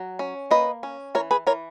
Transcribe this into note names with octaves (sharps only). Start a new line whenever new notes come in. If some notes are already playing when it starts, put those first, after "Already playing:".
Already playing: F#3
C#4
A#3 B4 D#5
C#4
E3 A#4 C#5
G#4 B4
E3 A#4 C#5